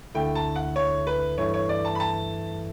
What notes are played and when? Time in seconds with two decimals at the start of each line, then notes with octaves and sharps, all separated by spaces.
0.15 D2 D3 A3 E4 G5
0.35 A5
0.55 F#5
0.76 C#5
1.07 B4
1.37 G2 E3 A3 E4 C#5
1.54 C#5
1.69 D5
1.85 A5
1.95 B5
2.00 A5